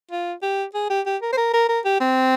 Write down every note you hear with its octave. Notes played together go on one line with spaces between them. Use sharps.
F4
G4
G#4
G4
G4
A#4
C5
A#4
A#4
A#4
G4
C4